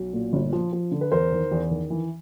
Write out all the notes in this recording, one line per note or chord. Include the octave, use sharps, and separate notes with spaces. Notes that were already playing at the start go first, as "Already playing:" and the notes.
Already playing: B1
A#2
G1
F3
F3
D3
B4
E2 A#4 C5
D#3
E2
D#3
E3